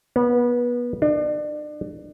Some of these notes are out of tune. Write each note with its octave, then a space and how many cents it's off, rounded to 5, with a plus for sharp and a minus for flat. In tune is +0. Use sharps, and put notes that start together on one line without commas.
B3 -25
D4 +35